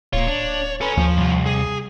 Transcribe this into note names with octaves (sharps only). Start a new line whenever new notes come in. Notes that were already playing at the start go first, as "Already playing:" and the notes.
D1 A#2 F4 C#5
D4
A4 B4 C#5 G#5
D#2 F3
C2 G2
G#4